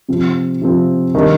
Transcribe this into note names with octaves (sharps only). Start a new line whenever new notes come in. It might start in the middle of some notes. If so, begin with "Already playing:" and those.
C3 F3 C4
C3 F3 C4
D#3 G3 D4